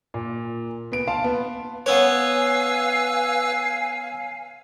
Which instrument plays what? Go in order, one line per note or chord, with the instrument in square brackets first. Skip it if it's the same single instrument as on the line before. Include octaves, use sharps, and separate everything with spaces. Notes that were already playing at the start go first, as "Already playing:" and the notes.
[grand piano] A#2
B3 D7
F5 A5 C6
B3
[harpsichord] B3 C#4 C#5 [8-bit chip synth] B4 E6 [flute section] F5 G#5